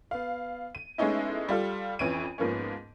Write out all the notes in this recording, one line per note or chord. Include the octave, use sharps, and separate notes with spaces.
B3 F5
D#7
G#3 A3 B3 C#4 D#4 E4
G3 F4 A4
F2 E3 C#4 C#5 D7 D#7
G#2 F3 A#3 B3 C#4